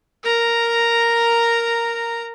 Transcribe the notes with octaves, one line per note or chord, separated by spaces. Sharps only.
A#4 A#5